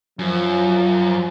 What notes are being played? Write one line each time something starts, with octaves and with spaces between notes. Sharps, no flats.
F#2 F3